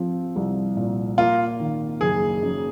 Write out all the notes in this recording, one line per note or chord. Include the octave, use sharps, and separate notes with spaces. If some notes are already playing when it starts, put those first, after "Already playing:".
Already playing: F3 C4
C2
A#2
A#3 F4
D#3
F#1 G#4
F#2